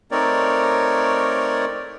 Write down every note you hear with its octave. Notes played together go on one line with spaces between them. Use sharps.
A3 C4 D#4 A#4 C#5 D5